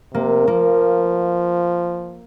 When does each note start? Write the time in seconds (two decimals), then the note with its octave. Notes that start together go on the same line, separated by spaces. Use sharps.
0.14 C3 A#3
0.47 F3 A#3